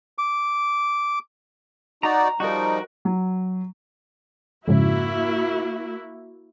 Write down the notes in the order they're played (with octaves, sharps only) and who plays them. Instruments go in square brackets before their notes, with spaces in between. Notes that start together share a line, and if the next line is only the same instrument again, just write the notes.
[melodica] D6
[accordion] D#4 F#4 D5 [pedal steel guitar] A#5
[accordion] F3 G3 D#4 [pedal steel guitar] F#4 A#4
[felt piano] F#3
[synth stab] F2 G#2 C#3 [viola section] A#3 E4 F#4